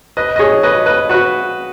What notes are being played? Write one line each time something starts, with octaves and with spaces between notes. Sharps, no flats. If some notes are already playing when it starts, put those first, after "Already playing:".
B4 D#5
D#5
G#4 C#5
B4 D#5
B4 D#5
F#4 B4